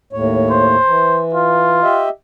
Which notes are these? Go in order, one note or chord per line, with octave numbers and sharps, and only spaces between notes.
D#2 A2 C#5
C5
E3
F4
G4 D#5 E5